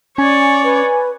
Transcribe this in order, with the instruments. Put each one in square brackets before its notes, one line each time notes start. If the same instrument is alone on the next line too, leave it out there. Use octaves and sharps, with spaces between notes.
[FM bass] C#4 [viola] C#5 D5 [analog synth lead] G#5
[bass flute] B4